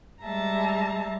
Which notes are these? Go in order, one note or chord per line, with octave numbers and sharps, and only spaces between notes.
G3 G#3 E5 A5 A#5